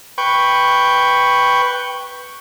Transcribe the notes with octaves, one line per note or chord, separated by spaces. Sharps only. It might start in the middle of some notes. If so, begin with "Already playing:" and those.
B4 G5 C#6